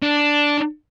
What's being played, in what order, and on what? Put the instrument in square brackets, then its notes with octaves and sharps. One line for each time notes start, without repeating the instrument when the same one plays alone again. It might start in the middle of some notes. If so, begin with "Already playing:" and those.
[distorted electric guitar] D4